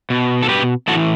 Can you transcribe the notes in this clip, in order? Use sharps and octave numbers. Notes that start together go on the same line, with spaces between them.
B2
A4
G4 B4
A2 E3 F#4 A4